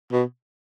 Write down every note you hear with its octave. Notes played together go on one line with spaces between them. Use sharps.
B2